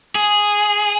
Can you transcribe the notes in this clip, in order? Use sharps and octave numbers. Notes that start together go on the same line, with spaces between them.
G#4